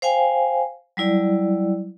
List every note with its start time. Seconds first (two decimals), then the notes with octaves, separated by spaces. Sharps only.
0.02 C5 F5 G5 G#5
0.97 F#3 G3 E4 D5